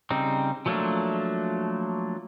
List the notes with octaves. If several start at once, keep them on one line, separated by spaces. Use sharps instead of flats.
C#3 G3 C4 D#4
F3 F#3 A3 A#3 D4